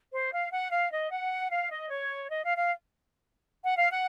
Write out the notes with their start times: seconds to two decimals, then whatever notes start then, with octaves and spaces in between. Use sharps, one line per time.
0.12 C5
0.32 F5
0.52 F#5
0.71 F5
0.92 D#5
1.11 F#5
1.51 F5
1.71 D#5
1.91 C#5
2.30 D#5
2.44 F5
2.57 F5
3.64 F#5
3.77 F5
3.91 F#5